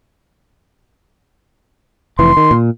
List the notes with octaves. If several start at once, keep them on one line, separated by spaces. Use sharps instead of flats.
F1 E3 C6
D#3
A#2